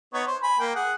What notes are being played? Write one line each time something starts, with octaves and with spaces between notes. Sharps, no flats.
B3 D#4 C#5
C5
G#5 B5
A#3 G5
G#4 F#5